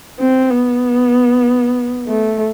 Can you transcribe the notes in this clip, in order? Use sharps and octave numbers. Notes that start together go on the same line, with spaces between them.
C4
B3
A3